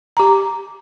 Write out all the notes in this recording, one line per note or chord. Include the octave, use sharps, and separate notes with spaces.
G4 A#5